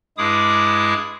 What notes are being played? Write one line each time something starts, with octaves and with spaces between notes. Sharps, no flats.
G2 G#3 E4 G#4 D6 D#6